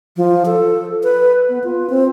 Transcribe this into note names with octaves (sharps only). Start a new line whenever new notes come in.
F3
A4
B4
B3
F4
C4